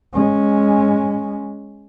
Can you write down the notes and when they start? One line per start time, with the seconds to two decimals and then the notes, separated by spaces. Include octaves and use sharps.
0.14 G#3 C#4